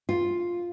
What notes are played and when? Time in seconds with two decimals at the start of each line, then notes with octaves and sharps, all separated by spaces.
0.09 F4